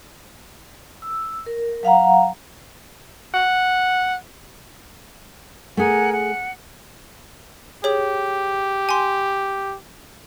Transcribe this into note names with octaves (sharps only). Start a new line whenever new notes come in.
E6
A#4
F#3 F5 F#5 A#5
F#5
A3 G#4 A#4 F#5 G#5
F#5
G4 G#4 C#5
G#5 C6